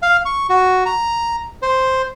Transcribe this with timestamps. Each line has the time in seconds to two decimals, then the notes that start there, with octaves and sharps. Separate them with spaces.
0.02 F5
0.25 C#6
0.49 F#4
0.86 A#5
1.62 C5